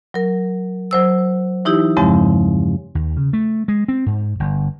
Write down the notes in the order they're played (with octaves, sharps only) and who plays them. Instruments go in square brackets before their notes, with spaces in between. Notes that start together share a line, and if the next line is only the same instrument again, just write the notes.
[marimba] F#3 A#4
F#3 C5 E6
E3 D#4 E4 G4
E2 G2 C#3 F3 G#3 C4
[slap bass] D#2
C#3
A3
G#3
C4
G#2
G1